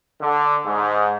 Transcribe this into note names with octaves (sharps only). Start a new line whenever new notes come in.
D3
G#2